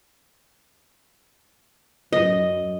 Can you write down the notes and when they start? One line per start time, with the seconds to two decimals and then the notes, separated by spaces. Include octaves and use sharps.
2.13 F#2 D#5